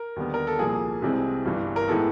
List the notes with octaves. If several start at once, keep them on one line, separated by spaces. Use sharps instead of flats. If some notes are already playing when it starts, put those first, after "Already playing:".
Already playing: A#4
D#2 D3 G3 B3
A#4
A4
C2 A#2 F3 A#3 G#4
C2 C3 E3 G#3 C4
G1 G2 E3
A#4
A2 E3 G#3 B3 A4